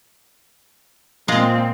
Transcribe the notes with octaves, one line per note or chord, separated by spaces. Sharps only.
A#2 G#3 C4 F4